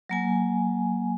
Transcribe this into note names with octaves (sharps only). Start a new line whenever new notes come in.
F#3 A#3 G#5